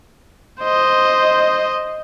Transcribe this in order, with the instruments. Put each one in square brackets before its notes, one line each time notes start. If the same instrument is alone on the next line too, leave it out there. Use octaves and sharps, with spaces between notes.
[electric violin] C5 D#5